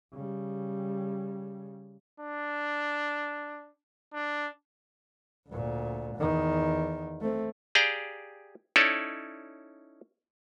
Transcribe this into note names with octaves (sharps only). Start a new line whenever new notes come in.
C#3 G3
D4
D4
D2 A#2
E2 D#3
A3 C4
G4 G#4 D5 F5 G5 A#5
C#4 D#4 E4 A4 C#5 D5